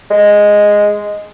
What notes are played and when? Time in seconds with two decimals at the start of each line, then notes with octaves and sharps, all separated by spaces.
0.11 G#3